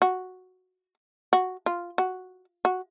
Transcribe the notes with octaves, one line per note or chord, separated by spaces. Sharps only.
F#4
F#4
F4
F#4
F#4